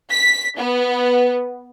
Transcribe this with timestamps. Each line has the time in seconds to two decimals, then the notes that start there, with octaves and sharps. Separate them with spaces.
0.11 B6
0.57 B3